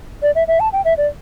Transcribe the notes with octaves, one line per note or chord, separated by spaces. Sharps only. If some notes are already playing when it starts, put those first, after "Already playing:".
D5
E5
E5
A5
G5
E5
D5